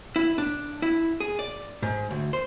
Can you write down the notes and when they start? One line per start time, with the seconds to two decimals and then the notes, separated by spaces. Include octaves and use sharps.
0.16 E4
0.38 D4
0.82 E4
1.20 G#4
1.39 D5
1.83 G#2
2.11 D2
2.33 C5